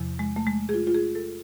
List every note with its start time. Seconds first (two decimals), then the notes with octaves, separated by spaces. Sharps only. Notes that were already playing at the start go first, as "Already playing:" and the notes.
Already playing: E2 C3 F3
0.19 G#3
0.36 A3
0.47 G#3
0.69 G#4
0.74 F4
0.87 F4
0.94 G#4
1.15 A4